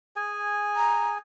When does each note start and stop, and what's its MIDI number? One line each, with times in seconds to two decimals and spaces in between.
0.16 1.18 68
0.16 1.18 80
0.76 1.12 82